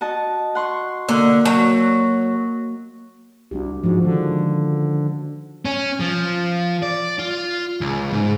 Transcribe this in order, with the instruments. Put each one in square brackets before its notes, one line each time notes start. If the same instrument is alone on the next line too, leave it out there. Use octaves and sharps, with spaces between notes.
[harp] F#4 D#5 A5
F#5 C6 C#6
[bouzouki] D3 [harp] A#3 F#5
[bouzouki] F#3
[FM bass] C2 [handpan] D4 F#4 G4
[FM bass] G#2 [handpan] F3 G#3 F#4
[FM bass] D3 [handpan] D#3 G#3 C#4
[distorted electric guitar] C#4
F3
D5
F4
C#2
G#2